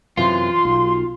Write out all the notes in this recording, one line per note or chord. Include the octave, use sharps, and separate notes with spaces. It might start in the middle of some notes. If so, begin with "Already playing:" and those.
F#2 C3 E3 F4 C6
B1